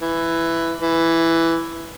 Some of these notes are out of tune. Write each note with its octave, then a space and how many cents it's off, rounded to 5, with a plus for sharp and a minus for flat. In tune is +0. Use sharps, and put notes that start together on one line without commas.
E3 +10
E3 +5